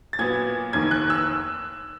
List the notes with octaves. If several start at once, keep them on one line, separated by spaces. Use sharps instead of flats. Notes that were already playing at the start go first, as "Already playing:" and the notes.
A6
A#2 F#3 B3 G#6
F1 D#2 D#3 G#6
F#6
E6